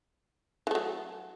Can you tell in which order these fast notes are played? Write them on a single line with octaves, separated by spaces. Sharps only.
E3 A3 F#3